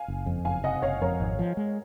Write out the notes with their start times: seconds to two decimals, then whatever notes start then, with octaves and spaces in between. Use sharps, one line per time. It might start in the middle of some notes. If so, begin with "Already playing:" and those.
Already playing: F5 G#5
0.08 F#1
0.26 F2
0.45 F#1 F5 G#5
0.63 C3 D#5 F#5
0.82 F#1 C#5 F5
1.01 F2 A#4 C#5
1.20 G#1
1.39 F3
1.57 G#3